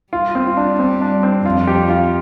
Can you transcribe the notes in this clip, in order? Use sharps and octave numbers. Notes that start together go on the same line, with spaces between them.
G3 F4
C4
F4
D4
C4
D4
C4
F2 F4
G4
F4